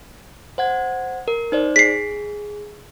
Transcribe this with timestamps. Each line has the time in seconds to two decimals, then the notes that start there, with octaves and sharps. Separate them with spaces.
0.58 C5 F#5 G#6
1.28 A#4
1.52 D#4 C5 D5
1.76 G#4 B6 C7